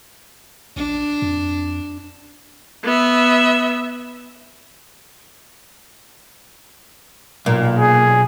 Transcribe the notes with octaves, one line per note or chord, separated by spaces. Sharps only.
A#1 D4
F2
B3 E5
B1 A#2
G#4